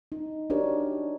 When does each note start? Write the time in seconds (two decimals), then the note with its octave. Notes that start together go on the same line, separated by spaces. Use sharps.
0.12 D#4
0.50 D4 F#4 G4 A#4 C#5 D5